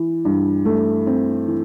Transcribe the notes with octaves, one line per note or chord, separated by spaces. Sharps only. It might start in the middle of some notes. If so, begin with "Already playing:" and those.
Already playing: E3
G2
A3
C4
E3